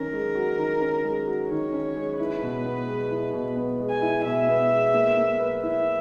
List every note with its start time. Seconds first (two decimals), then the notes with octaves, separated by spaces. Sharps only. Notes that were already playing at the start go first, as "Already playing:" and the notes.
Already playing: D#3 C#4 A#4
0.13 G#3
0.35 F#4
0.58 D#3
0.81 C#4
1.04 G#3
1.26 F#4
1.49 D#3 C#5
1.73 C#4
1.96 G#3
2.19 E4 B4
2.42 B2
2.65 B3
2.87 G#3
3.11 E4
3.33 B2
3.56 B3
3.80 G#3
3.90 G#5
4.02 E4
4.25 B2 E5
4.49 B3
4.71 G#3
4.94 A#3
5.17 A#3
5.40 B4
5.63 E4 E5